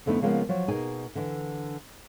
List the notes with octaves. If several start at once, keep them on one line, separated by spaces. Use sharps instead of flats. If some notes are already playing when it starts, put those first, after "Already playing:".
F2 D3 A3 B3 D#4 E4
C#3 F3 G#3 A#3 B3
F3 F#3
B2 A#3 D#4 G#4 G#5
D3 E3